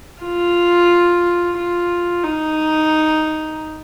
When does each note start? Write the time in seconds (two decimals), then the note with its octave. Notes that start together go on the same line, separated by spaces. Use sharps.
0.23 F4
1.57 F4
2.24 D#4